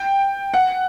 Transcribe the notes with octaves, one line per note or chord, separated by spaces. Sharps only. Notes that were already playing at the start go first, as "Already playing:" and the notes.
Already playing: G5
F#5